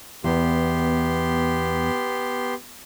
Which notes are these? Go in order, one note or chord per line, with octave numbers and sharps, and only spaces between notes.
E2 B3 G4 C6